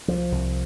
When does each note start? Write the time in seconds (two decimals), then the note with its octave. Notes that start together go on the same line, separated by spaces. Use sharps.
0.08 C2 F3
0.32 C2